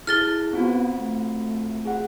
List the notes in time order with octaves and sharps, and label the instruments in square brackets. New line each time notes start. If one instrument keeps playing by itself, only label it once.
[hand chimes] E4 G#4 A4 [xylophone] F6 A6 G7
[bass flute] B3 [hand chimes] C4 F4 F#4
[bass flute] A3
[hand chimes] G#4 F#5